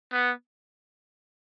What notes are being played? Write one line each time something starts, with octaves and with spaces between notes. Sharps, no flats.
B3